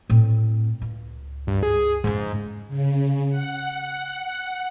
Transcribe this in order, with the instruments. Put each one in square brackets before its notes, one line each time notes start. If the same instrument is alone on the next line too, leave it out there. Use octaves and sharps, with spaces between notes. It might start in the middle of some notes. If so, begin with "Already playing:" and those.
[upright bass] A2 C4
C#2
[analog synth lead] G2
G#4
[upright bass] F2 C#3 [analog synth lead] G#2
[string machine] C#3
F#5